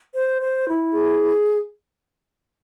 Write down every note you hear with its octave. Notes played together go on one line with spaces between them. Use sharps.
C5
C5
E4
G#4